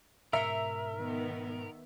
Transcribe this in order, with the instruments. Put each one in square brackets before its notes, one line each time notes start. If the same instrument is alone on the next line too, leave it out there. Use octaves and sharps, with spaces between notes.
[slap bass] G#2 B2 [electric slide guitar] A#4 [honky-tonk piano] E5
[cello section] D#3 B3